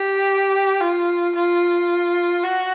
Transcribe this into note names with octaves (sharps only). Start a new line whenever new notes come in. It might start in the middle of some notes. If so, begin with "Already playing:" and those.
Already playing: G4
F4
F4
F#4